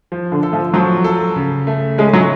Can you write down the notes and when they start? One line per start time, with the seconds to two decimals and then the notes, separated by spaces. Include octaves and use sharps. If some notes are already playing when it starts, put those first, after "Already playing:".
0.12 F3
0.32 D3
0.43 A4
0.53 F3
0.74 F3 F#3
1.04 A4
1.36 C#3
1.67 A3
1.98 G#3 C#4
2.13 F#3